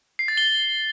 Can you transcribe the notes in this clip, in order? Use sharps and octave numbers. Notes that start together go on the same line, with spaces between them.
C7
A6
G7